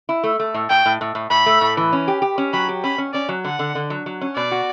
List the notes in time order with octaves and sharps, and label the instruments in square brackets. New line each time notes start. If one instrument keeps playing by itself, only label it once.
[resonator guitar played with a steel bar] E4
A3
A3
A2
[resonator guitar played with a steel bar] A2 [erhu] G5
[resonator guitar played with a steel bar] A2
A2
A2
[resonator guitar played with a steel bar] A2 [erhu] B5
[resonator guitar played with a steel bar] A3
A2
E3
C#4
G4
G4
C#4
[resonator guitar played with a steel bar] F#3 [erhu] B5
[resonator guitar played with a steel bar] G4
[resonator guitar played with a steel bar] C#4 [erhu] B5
[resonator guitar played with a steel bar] C#4
[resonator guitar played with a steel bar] C#4 [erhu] D5
[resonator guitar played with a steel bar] F#3
[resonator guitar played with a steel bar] D3 [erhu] F#5
[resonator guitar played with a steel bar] D3
D3
F#3
F#3
C#4
[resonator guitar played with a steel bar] B2 [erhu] D5
[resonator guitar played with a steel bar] F#4